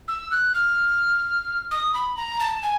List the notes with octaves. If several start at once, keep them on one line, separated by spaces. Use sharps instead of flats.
E6
F#6
F6
D#6
B5
A#5
A5
G#5